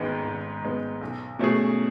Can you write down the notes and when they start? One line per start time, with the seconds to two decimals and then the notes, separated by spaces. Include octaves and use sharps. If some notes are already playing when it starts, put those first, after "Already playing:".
Already playing: G#1 G#2 G#3 B3
0.24 G#1
0.62 G#2 G#3 B3
1.01 B1
1.39 B2 A3 C#4 G#4